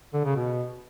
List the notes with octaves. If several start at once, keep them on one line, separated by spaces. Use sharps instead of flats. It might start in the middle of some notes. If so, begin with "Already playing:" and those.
D3
C#3
B2